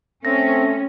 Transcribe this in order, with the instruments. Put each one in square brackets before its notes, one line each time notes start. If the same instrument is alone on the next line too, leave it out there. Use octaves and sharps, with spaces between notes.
[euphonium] A3 [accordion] C4 [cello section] C#4 [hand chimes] A#6